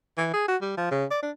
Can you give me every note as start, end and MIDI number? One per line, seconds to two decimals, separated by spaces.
0.18 0.32 52
0.33 0.44 68
0.48 0.56 66
0.61 0.73 55
0.77 0.90 53
0.91 1.05 49
1.11 1.18 74
1.22 1.31 62